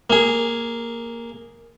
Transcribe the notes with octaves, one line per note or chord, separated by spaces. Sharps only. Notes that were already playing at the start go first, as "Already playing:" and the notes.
A#3 G#4